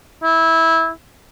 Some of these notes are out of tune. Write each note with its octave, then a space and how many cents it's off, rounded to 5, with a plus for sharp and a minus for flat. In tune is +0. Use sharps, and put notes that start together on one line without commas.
E4 -15